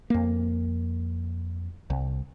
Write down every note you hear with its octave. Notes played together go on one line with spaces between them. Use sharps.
F2 A#3
C2